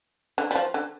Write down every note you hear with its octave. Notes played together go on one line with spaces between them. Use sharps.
D3
G3
F3
D3